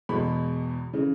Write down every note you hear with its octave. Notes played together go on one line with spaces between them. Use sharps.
E2 B2 G#3 B5
C#3 E3